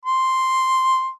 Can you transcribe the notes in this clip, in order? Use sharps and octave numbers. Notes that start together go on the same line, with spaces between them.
C6